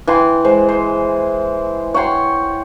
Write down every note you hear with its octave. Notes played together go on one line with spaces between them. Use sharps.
E3 G5 C6
G#3 C5
C5
C#5 F#5 G5 C6